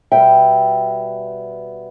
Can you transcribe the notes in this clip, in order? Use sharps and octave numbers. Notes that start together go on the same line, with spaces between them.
B2 G3 B3 E5 G5